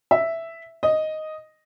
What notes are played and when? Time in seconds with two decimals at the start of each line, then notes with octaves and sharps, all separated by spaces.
0.11 E5
0.83 D#5